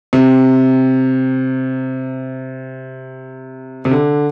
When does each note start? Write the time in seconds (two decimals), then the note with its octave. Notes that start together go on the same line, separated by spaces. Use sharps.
0.13 C3
3.85 C3
3.91 D3